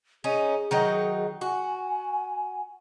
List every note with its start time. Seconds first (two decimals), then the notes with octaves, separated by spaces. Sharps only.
0.24 C#4 D#4 G#4
0.71 D#3 F#3 D#4
1.41 F#4 G#5